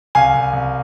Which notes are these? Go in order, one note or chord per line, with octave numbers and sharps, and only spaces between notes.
C2 F5 G#5
C2
C2